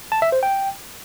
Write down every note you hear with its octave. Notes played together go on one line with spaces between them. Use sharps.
A5
E5
C5
G5